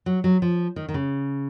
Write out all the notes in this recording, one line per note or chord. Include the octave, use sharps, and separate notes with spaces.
F#3
F#3
F3
D#3
D#3
C#3